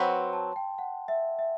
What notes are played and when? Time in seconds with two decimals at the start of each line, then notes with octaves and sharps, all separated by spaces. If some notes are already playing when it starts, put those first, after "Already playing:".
Already playing: F#3 C4 F#4 B4
0.11 C6
0.33 A5
0.56 G5
0.79 F#5
1.08 E5
1.39 E5